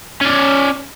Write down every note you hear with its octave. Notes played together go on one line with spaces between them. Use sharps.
C#4 D5